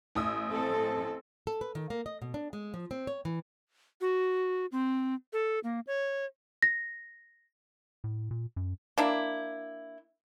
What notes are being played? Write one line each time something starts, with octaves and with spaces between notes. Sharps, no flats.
A1 D#6 E6
C4 A4
A4
B4
D#3
A#3
D#5
B2
D4
G#3
F3
C4
C#5
E3
F#4
C4
A4
A#3
C#5
A#6
A2
A#2
F#2
A#3 D4 E4